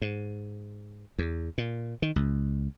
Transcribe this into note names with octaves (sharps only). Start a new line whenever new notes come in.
G#2
E2
A#2
D#3
C#2